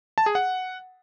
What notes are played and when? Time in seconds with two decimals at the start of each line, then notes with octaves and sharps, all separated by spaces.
0.18 A5
0.26 G#4
0.35 F#5